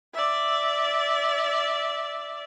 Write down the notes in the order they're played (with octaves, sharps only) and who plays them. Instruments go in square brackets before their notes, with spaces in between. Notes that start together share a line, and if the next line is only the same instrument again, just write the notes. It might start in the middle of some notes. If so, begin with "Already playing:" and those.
[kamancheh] D5 E5